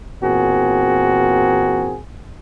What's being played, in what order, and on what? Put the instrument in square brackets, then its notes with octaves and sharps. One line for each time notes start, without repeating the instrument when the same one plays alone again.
[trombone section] E2 A#2 C4 F#4 G#4 A#4